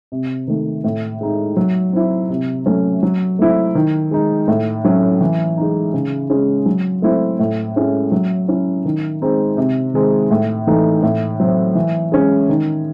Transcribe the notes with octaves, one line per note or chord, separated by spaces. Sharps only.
C3
D#3 A3
A2
G#3 D#4
F#3
C4 E4
C3
F#3 A3 C#4
F#3
A3 C4 E4
D#3
G#3 D#4
A2
F#3 C#4
E3
G#3 D#4
C#3
G#3 C#4
F#3
A3 C4 E4
A2
G#3 C#4 E4
F#3
C#4 E4
D#3
G#3 C4 D#4
C3
D#3 G#3 C4 D#4
A2
E3 A3 D#4
A2
F#3 C4
E3
G#3 C#4
D#3